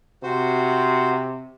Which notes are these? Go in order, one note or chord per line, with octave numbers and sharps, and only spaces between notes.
C3 F#4 C5